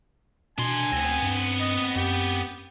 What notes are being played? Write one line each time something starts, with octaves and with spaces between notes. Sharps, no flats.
B2 D4 G#5 C6
D2 B3 C4
G2
D#5
F#2 G4